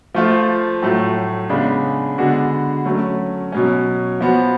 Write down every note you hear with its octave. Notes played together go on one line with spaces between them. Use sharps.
F3 A3 F4
A2 F#3 A3
C#3 G#3 B3 D4
D3 G#3 B3 D4 F#4
F#3 A3 C#4
B2 F#3 C#4
F3 B3 F#4